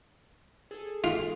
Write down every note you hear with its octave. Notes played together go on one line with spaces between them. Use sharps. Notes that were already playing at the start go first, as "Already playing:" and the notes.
G#4 A4
F4